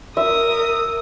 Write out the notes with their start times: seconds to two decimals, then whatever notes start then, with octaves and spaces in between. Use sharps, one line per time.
0.17 A#4 E5 D#6